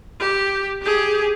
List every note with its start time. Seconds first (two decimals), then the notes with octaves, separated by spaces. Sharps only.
0.20 G4
0.82 G4 G#4